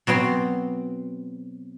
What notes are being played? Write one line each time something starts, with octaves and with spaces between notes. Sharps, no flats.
B2 F#3 C4 C6